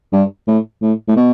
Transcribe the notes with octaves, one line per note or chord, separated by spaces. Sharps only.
G2
A2
A2
A2
B2